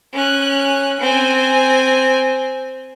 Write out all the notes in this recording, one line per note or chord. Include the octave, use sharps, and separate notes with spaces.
C#4 F#6
C4 G#5